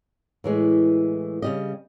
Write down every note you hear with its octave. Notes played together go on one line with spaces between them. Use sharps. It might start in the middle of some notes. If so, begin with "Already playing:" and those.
A2 E3 G#3
C#3 G3 D#5